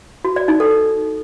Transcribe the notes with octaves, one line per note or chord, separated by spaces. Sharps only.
F#4
D5
D#4
A4